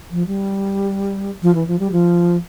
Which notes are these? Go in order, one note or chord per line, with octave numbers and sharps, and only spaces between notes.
F3
G3
F3
E3
F3
G3
F3